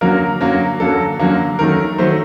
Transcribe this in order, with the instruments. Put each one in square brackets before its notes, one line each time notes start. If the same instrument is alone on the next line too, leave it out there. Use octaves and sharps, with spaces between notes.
[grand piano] F#2 D3 F#3 A#3 A#4
F#2 D3 F#3 A#3
F#2 D3 F#3 A#3 A4
F#2 D3 F#3 A#3
F#2 D#3 F#3 A3 A#4
D#3 F#3 A3 C5